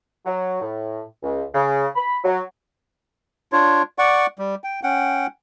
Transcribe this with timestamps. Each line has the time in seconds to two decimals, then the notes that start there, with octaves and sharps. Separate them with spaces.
0.26 F#3
0.61 A2
1.23 C#2
1.54 C#3
1.96 B5
2.24 F#3
3.52 D4 F4 C#5
3.99 D5 F#5 C#6
4.39 G3
4.64 G5
4.83 C#4 F#5 G5